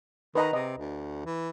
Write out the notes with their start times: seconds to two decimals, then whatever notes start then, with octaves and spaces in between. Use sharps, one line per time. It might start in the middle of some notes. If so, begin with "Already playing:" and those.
0.35 D#3 B4 D#5 A#5
0.53 C3 D#5
0.78 D2
1.26 E3